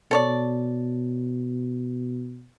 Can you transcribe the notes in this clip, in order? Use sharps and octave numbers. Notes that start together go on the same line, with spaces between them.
B2 A4 C#5 D5